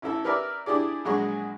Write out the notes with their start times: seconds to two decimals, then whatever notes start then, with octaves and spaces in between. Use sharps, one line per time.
0.02 A1 E4 A4 E5
0.24 G4 A#4 B4 D5 E5
0.66 D4 E4 G4 G#4 D5
1.05 A#1 F#3 G#3 F#4 G#4 C#6